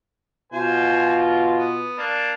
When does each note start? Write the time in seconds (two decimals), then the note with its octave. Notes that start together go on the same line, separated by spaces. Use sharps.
0.52 B2 F4 C5 G#5
1.59 B3
1.98 A#3 D4